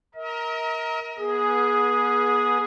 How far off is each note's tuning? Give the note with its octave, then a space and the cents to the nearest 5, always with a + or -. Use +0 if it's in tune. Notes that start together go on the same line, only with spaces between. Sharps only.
A#4 +5 D#5 +45
B3 -35 G#4 +0